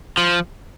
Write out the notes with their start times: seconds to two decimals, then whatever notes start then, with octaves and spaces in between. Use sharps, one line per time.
0.18 F3